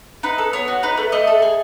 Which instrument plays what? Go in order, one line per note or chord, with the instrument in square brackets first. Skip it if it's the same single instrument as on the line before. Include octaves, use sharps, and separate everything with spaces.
[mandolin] D#4 B4
A4
B3 C#5
F#4
D#4 B4
A3
A3 D#5
A4
G#4